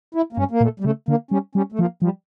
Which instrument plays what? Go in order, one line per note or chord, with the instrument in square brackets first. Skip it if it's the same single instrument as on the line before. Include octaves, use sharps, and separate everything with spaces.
[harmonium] E4
A#3
[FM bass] G2 [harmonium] C#4
[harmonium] A#3
[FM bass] A#2 [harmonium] A3
[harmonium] G3
[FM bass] C#3 [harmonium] A3
[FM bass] D3 [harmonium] A#3
[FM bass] G3 [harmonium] C#4
[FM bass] G3 [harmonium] C#4
[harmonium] A3
[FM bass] F3 [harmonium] A#3
[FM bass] F3 [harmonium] G3